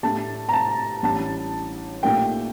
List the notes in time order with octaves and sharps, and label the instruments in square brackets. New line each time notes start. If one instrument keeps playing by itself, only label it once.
[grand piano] A2 A3 D4 G4 [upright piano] A5
[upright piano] A#5
A5
[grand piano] A1 A2 G3 D4 [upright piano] A5
[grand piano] A#2 A3 D#4 G4 A#4 [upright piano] G5